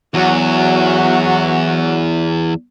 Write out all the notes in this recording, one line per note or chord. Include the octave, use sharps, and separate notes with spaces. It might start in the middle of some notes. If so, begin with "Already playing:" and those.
E2 F#3 F#4